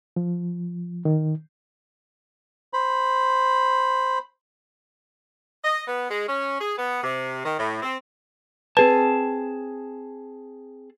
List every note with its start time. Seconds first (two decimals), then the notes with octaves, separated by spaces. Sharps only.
0.16 F3
1.05 D#3
2.73 C5 B5
5.65 D#5
5.88 B3
6.10 G#3
6.28 C#4
6.61 G#4
6.78 B3
7.04 C3
7.45 D#3
7.59 A2
7.82 C4
8.77 C4 G#4 B4 A5